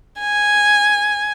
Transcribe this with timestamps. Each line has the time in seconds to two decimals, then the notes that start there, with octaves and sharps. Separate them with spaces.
0.20 G#5